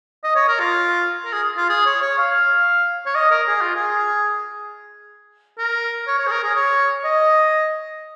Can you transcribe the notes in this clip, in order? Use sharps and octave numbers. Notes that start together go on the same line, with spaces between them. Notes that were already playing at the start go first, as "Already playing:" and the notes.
D#5
C#5
A#4
F4
A#4
G#4
F4
G#4
C#5
C#5
F5
C#5
D#5
A#4
G#4
F4
G#4
A#4
C#5
C#5
G#4
A#4
G#4
C#5
D#5